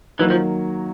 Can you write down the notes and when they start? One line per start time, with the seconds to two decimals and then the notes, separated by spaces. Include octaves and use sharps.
0.19 D#3 E3 F#3 A#3
0.30 F3